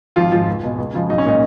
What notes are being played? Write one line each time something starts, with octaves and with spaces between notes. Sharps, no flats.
G#1 F3 F4
G#2 F3 F4
C#2
B2 G#3
C#2
C#3 F3 G#3
B1 D#4
C#4
A#2 G#3 D#4